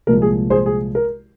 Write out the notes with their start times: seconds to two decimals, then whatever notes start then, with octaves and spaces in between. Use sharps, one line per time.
0.07 C2 A#2 F3 G#3 A#4
0.22 G#4
0.50 G#4 C5
0.66 G#4
0.95 A#4